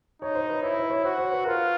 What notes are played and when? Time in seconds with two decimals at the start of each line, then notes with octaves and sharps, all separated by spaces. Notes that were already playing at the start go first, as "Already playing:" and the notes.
0.21 D#4 C#5
0.35 C5
0.49 B4
0.63 E4 C#5
0.77 C5
0.90 C#5
1.04 F#4 C5
1.18 C5
1.32 B4
1.45 F4 A#4